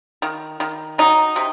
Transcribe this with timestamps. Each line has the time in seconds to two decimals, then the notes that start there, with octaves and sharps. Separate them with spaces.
0.22 D#3
0.60 D#3
0.98 F#3 D#4
1.36 C3